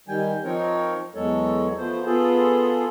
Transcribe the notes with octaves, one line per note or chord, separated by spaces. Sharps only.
D#3 G3 G5 G#5
F3 C4 D#4 A#4 C#5
E2 F#3 G#3 A4 C#5
F3 A3 B3 C5
B3 F4 G#4 A4